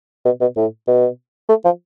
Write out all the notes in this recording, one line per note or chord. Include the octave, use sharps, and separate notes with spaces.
B2
B2
A2
B2
A3
F3